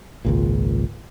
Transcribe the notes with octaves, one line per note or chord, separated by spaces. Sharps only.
G#1 C#2 A#2